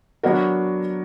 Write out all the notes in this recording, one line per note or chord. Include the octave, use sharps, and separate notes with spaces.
F#3 B3 D4 F#4 A#4